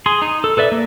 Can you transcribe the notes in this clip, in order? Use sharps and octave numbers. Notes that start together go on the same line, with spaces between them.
G#4 C6
D#4
A4
A4 B4 D5 E5
A#3